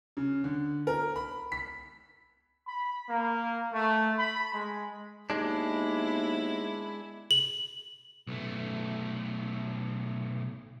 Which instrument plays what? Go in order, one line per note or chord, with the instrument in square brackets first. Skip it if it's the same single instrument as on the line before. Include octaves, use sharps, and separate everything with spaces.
[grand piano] C#3
D3
A#4
B5
B6
[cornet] B5
A#3
A3
B5
G#3
[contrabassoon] D#2 [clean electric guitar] G#3 D4 [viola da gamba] B3 E4
[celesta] F#7
[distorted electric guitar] B1 A3